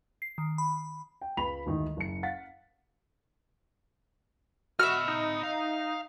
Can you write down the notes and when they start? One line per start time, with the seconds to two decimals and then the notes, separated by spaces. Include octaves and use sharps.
0.22 C7
0.38 D#3
0.58 B5
1.21 G5
1.37 C#2 B4 B5 B6 F7
1.66 D2 G#2 D#3 D#4 E4
1.97 F#1 C#7
2.23 F5 F#5 A6 B6
4.79 F#4 D#5 E5 B5 F6
5.08 D#4
5.43 F5